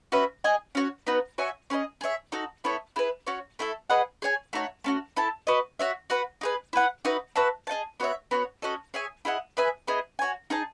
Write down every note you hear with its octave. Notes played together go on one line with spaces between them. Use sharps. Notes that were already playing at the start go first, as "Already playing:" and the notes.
C#4 F#4 B4 E5
G#4 D#5 G#5
C#4 F#4 C#5
B3 D#4 F#4 B4
F#4 C#5 E5 G#5
C#4 G#4 B4 D#5
G#4 C#5 E5
D#4 F#4 A4
B3 E4 A4 C#5
E4 G#4 B4
C#4 F#4 C#5
A3 E4 A4
G#4 B4 D#5 F#5
G#4 C#5 G#5
A3 D#4 F#4 C#5
A3 C#4 F#4
E4 A4 E5 A5
F#4 B4 D#5
F#4 C#5 E5
F#4 B4 F#5
D#4 G#4 B4
E4 B4 F#5
D#4 F#4 B4 E5
F#4 B4 E5 A5
G#4 D#5 F#5 A5
B3 F#4 C#5 E5
B3 F#4 C#5
C#4 F#4 A4 D#5
G#4 C#5 E5 G#5
E4 G#4 D#5 F#5
G#4 B4 E5 G#5
B3 E4 G#4 D#5
F#4 C#5 G#5
D#4 G#4 D#5 A5